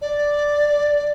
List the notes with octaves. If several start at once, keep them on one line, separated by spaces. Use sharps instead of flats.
D5